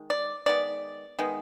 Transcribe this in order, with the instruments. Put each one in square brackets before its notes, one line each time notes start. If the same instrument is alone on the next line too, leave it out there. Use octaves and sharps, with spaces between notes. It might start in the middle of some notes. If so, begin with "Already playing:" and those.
Already playing: [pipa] D#3 G#3
D5
D#3 G#3 B3 D5
D#3 G#3 B3